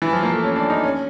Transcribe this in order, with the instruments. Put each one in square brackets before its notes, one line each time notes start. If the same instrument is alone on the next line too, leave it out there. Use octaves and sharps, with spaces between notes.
[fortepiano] E3
F3
A#3
A3
C#4
D4
D#4
C#4